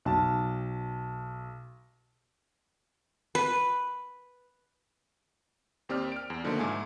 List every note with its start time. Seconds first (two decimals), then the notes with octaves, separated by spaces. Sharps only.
0.05 B1 A5
3.35 B4
5.89 D#2 C4 G4 D5 F6
6.12 F6 D7
6.30 E2
6.44 B2 D3 D#3 F3 A3 A#3
6.59 G#2 A3 G#5